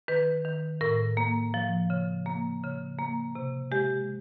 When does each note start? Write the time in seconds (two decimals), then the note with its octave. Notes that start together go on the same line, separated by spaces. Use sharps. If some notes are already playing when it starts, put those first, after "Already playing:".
0.08 D#3 B4
0.45 D#3
0.81 A2 A#4
1.17 A#3
1.54 F3
1.90 C#3
2.26 A#3
2.63 C#3
2.99 A#3
3.35 C3
3.71 G#3 G4